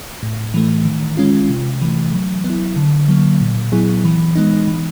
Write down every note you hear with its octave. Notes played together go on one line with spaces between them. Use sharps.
A2
E3 A3
D#3
G#3 C#4 F4
C3
E3 A3
F#3
B3
E4
D3
F#3 A#3
A#2
F#3 B3 E4 G#4
E3
G#3 B3 D#4
E3